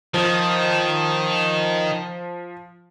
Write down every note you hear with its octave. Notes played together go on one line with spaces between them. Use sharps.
D#3 F3